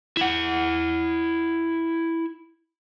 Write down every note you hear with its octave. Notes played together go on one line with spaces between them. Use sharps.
E4 F#5